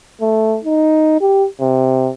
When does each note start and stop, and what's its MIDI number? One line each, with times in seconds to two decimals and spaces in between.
0.22 0.58 57
0.64 1.20 63
1.21 1.46 67
1.61 2.10 48